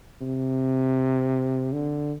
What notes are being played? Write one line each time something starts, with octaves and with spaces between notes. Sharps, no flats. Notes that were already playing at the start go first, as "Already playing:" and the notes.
C3
D3